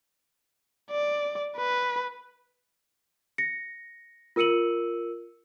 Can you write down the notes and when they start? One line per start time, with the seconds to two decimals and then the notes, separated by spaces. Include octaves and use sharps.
0.91 D5
1.57 B4
3.38 A#6 C#7
4.36 F4 A#4 E6 C#7 D#7 F#7